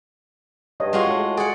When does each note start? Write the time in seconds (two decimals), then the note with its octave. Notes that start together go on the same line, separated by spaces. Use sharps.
0.80 G2 C#5 D#5
0.93 G#3 F4 F#4
1.07 A2 A4
1.37 G#4 D5 F#5